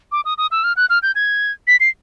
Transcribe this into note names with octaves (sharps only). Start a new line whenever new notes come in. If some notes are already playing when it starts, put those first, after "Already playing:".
D6
D#6
D#6
E6
F6
F#6
F6
G6
G#6
B6
C7